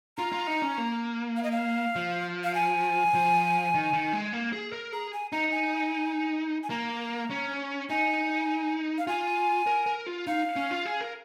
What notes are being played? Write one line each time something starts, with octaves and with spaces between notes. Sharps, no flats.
F4 A#5
F4
D#4
C#4
A#3
F5
D#5
F5
F3
F5
G#5
F3
D#3
D#3
G#3
A#3
G#4
A#4
G#4 A#5
G#5
D#4 A#5
G#5
G#5
A#3 A#5
C#4
D#4 G#5
F5
F4 G#5
A#4
A#4
F4
D#4 F5
C#4
F4
G#4
A#4